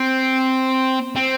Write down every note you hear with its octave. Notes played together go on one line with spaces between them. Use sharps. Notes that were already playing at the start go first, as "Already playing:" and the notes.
Already playing: C4
C4